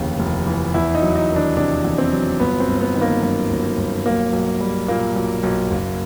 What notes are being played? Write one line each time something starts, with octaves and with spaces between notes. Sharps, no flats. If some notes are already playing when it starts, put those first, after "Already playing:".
Already playing: F1 D#2 C#3 E3
F1
E3
E2 E4
D#4
F#3
D#4
D#3
D4
C3 D4
E2
C4
F#3
G1 B3
C4
G1
B3
D#3
A#3
F#2
G1
G1
B1 A#3
B1
G3
A#2 A#3
B1
B1
F#1